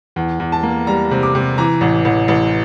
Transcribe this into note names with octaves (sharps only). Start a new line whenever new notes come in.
E2
E2
A5
A#3
G3 A#5
C3
D6
C3
E3 A#5
A1
A1
A1